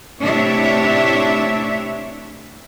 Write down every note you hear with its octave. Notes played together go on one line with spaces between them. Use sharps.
C3 A3 D4 E4 C#5 E5